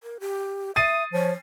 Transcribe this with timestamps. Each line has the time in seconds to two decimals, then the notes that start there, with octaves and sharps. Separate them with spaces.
0.03 A#4
0.20 G4
0.76 E5 D#6 A6 C7 D#7
1.13 F3 C#5